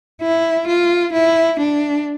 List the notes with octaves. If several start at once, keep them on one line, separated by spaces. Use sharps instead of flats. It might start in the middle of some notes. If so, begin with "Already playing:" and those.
E4
F4
E4
D4